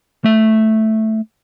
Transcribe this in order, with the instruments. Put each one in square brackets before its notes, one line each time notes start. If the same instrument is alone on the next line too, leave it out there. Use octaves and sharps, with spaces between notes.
[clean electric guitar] A3 E5